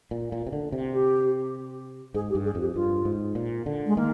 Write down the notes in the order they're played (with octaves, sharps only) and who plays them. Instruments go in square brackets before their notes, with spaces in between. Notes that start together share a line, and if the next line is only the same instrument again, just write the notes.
[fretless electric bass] A#2
A#2
C3
D3
C3
[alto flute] G4
[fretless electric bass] G#2 [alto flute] G#4
[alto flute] G4
[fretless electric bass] G2
[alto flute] G#4
[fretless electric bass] F2
[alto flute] G4
[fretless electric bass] G2 [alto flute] F4
[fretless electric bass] G#2
A#2
D3
[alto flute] G#3
[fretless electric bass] D#3 [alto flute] A#3